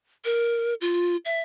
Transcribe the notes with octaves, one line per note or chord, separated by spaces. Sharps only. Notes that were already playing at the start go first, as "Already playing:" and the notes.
A#4
F4
E5